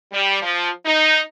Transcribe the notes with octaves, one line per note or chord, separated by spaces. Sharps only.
G3
F3
D#4